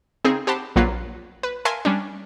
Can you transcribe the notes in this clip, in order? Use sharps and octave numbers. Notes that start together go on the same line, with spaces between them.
C#3 C4 D#4 G#4
G4 C5 F#5 A5 B5
A#1 F#3 A#3 F4 B4 C7
B4
A#4 E5 F5 G#5 A5 C6
G3 C#4 D4